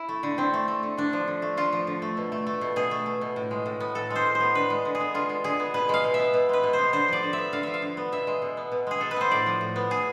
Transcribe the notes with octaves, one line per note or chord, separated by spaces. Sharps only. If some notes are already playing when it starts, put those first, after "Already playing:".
Already playing: E4
A3
D3
D3 C4
A3
A3
D3
D3 D4
F3
D3
A3
D3 F4
F3
D3
A3
B2
A3
A3
B2
B2 G#4
A3
A3
B2
A2
G#3
A2
B3
A2 A4
G#3
C5
A2
C5
B3
D3 B4
G#3
D3
G#4
B3
D3 F4
G#3
D3 G#4
B3
B2 B4
G#3 F5
B2
B3 E5
B2
G#3 B4
B2
B3 C5
D3 C5
F3 D5
D3
B3 E5
D3 F5
F3 E5
F5
D3
B3
B2 E5
G#3
B2
B3
B2
G#3 G#4
B2 A4
B4
B3 C5
A2 D5
F3
A2
B3
A2 G#4